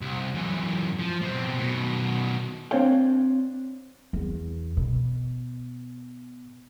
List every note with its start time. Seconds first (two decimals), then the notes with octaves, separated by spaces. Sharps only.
0.01 C2
0.35 F#2 E3
0.99 F3
1.22 B2 C4
1.58 B2 D#3
2.71 C4 D4 C#5 F5 G5
4.13 E2
4.77 B2